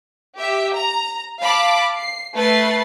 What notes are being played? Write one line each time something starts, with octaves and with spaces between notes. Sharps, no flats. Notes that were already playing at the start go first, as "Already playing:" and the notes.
G4 E5
A#5
F5 A5 B5 D6
C7
A3 B4 A6 C7